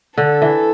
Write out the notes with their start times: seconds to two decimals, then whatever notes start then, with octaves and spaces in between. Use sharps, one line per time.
0.18 D3 A4
0.42 E3